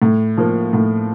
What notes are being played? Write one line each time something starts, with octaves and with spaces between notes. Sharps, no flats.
A2
F3 A#3
A2